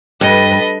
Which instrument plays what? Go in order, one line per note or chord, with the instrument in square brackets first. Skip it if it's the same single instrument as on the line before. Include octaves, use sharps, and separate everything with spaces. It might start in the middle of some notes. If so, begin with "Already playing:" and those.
[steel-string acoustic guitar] G2 [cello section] A4 B4 [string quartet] D#5